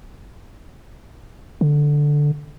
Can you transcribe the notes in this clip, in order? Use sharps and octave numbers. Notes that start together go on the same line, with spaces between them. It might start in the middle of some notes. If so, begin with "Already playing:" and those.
D3